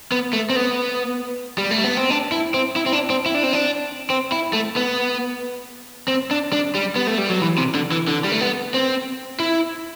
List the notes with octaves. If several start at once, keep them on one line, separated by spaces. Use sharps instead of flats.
B3
A3
C4
B3
G3
A3
B3
C4
D4
E4
C4
E4
C4
D4
C4
E4
D4
C4
D4
C4
E4
A3
B3
C4
D4
D4
G3
B3
A3
G3
F#3
E3
C3
D3
E3
D3
G3
A3
B3
C4
E4